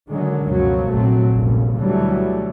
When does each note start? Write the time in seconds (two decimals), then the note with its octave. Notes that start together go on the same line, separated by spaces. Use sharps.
0.11 D3 D#3 F#3 G#3
0.45 C#2 F#2 B2 F3 F#3
0.91 F1 A#1 A#2 F#3 A3 C4
1.31 F1 A#1 G2 A#2 C#3
1.76 D2 B2 E3 F#3 G3 A3